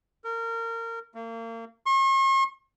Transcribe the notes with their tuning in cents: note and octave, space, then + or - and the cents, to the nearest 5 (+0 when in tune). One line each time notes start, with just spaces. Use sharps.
A#4 -25
A#3 -35
C#6 -45